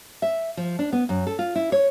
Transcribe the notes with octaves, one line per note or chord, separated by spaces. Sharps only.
E5
F3
D4
B3
F#2
A4
F4
E4
C#5